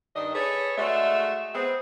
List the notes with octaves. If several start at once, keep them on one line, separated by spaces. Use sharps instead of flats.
G2 D#3 D4 D#5
G#4 A4 B4 C#5
G#3 A3 D4 F#4 D#5 E5
B3 C4 G#4